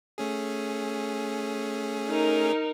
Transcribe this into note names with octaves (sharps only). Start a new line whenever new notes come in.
A3 C#4 G#4
D#4 A#4